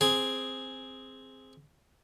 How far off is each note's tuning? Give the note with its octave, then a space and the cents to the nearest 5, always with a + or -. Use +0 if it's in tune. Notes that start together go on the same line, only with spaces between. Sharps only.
C4 +0 G#4 +0